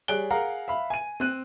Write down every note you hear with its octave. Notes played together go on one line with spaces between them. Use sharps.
G3 G#4 C#5 F#6 D7 G7
G#4 A#4 F5 F#5 A#5
E5 F5 B5
G#5 D#7
C4 F#6 D#7